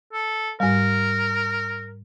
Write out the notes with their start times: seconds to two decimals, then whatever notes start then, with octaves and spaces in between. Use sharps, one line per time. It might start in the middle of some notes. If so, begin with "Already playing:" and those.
0.13 A4
0.60 G#2 G3 A#4